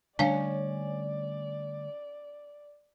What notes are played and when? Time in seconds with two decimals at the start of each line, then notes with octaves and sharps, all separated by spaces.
0.19 D3 G3 A3 C#4 D4 D5 F5